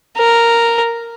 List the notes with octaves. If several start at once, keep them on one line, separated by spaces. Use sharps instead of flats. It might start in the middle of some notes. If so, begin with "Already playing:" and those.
A#4